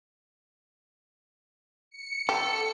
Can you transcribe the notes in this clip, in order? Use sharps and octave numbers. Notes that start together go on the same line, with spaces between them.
C#7
G4 A4